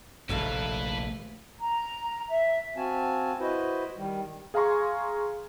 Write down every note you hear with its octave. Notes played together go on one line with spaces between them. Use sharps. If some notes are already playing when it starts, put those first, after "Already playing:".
F1 A#1 A2 D#3 A3 E4 B4 F5
A#5
E5
C4 F#4 F5 G#5 A5
E4 F#4 B4 C5 D#5
D#3 G3
G#4 F5 G#5 A#5 C6 C#6